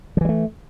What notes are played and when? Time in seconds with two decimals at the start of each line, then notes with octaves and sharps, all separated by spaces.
0.17 F3
0.21 E3
0.25 G3
0.29 A3